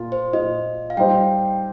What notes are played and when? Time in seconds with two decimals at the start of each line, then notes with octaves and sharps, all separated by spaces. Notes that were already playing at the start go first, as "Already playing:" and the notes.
Already playing: A#2 A#3 F4
0.12 C5
0.33 A#2 A#3 F4 D#5
0.90 F5
0.97 G3 D#4 C5 D#5 G5